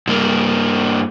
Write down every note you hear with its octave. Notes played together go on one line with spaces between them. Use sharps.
G2 A#3